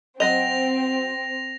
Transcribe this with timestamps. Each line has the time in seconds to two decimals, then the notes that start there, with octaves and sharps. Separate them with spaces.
0.20 F#3 C4 D#5 A#6 F7